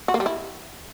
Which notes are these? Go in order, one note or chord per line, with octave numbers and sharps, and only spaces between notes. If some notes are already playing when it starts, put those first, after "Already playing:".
F#4
A#3
G3
E4